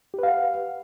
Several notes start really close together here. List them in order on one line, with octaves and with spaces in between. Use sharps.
G4 B4 F5 F#5